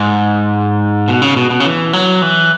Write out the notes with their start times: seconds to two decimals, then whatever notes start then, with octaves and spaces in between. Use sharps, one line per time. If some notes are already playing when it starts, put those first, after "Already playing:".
Already playing: G#2
1.08 B2
1.22 C#3
1.36 B2
1.50 B2
1.60 C#3
1.65 E3
1.93 F#3
2.22 E3